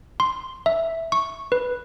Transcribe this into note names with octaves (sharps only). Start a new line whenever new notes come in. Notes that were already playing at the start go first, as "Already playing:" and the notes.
C6
E5
C#6
B4